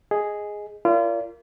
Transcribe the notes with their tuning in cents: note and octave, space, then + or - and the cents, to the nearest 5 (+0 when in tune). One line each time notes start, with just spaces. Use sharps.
G#4 +0 D#5 +0
F4 -35 A#4 +0 D5 -30